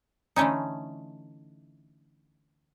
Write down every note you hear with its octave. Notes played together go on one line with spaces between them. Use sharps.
D3 E3 A3 C#4 D#4